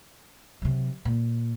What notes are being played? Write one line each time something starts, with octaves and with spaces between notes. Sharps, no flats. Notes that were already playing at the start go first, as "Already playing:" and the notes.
C3 F#3
A#2